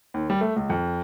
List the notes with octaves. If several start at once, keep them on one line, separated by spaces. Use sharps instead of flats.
D#2
G3
A3
C#2
F2